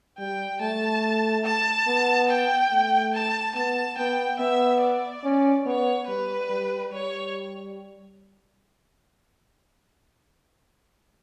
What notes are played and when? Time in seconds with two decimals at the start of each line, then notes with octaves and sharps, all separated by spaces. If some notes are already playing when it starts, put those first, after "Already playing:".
0.19 G3 G5
0.61 A3 A5
1.45 A5
1.87 B3
2.29 G5
2.71 A3
3.14 A5
3.55 B3 A5
3.98 B3 G5
4.40 B3 E5
4.81 D5
5.24 C#4
5.66 B3 C#5
6.07 G3 B4
6.50 G3
6.92 G3 C#5